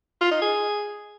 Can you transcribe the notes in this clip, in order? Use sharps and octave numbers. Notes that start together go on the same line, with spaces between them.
F4
D#4
G#4